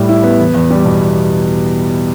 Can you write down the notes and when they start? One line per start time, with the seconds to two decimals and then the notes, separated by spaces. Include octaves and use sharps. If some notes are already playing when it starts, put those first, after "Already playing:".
Already playing: A2 G3
0.09 E4
0.23 B3
0.39 E2
0.54 E2
0.70 G3
0.86 B2